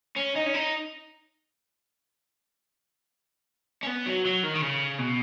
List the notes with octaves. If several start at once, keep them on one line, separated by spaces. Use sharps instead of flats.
C#4
D#4
C#4
D#4
C#4
B3
F#3
F#3
D#3
D#3
C#3
B2